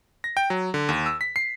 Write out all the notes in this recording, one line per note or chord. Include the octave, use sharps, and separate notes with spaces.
A#6
G5
F#3
D3
D#2
E6
B6
C7